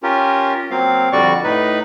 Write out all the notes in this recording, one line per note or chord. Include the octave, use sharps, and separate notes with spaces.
C#4 F4 G4 A#4
F#3 A#3 C4 F5
F2 D3 G3 F#4 D5 C#6
A2 D#4 B4